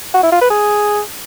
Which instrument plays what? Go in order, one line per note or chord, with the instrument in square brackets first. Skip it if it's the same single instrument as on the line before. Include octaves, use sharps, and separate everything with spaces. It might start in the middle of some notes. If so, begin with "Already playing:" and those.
[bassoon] F#4
E4
F4
B4
G#4